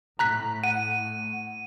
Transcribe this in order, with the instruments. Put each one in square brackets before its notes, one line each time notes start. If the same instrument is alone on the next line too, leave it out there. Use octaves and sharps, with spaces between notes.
[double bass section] A2 [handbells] A#5 F#6 B6
[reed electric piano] F#5 [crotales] D#7